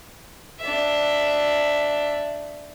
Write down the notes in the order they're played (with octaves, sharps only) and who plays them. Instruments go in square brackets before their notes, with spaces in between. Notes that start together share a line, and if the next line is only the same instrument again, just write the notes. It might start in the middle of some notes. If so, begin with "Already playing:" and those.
[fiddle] D4 E5